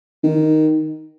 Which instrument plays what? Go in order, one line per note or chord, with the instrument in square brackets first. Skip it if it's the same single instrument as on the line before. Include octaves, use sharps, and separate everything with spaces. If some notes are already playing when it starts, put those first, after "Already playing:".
[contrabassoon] D#3